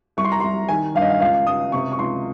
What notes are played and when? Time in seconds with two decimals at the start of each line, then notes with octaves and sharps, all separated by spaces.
0.17 C2 C#6
0.24 C6
0.32 A#5
0.40 C2 C6
0.68 D#3 G#5
0.95 G2 F5
1.02 D#5
1.10 F5
1.20 C#2 F5
1.47 C#2 D#6
1.72 C3 C#6
1.92 C#6
1.99 C#2 C6